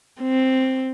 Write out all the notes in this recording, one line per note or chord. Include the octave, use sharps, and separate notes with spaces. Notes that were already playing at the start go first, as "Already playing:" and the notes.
C4